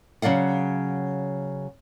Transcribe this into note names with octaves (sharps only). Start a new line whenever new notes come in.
C#3 F#3 D5 F5 F#5